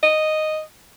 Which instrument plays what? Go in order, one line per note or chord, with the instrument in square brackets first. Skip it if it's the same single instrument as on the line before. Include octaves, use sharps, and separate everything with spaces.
[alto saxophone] D#5